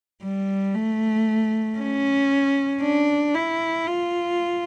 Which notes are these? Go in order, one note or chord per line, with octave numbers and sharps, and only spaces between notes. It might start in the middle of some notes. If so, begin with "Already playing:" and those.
G3
A3
C#4
D4
E4
F4